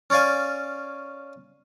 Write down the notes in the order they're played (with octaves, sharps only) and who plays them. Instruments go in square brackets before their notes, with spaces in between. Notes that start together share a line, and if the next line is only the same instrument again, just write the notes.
[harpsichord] C#4 C#5 D5 F5 G#5